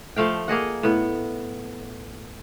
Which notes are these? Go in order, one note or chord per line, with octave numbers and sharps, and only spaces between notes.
F3 A3 F5 G5
A#3 G#4 D#5 F#5
A2 B3